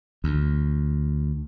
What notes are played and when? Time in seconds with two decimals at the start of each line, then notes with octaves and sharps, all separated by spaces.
0.24 D2